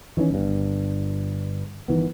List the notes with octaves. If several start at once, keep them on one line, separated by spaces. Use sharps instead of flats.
D#3 E3 G#3 C#4
G1 G2
G1 D#3 E3 B3